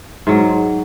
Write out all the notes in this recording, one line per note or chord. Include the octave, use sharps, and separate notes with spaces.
G#2 F#3